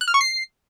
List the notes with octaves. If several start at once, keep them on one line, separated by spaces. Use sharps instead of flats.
F#6
F6
C#6
C7